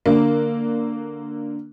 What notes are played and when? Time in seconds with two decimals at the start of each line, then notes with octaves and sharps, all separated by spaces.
0.06 D3 A#3